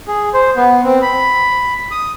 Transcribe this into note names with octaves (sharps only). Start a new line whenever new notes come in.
G#4
C5
B3
C4
B5
D#6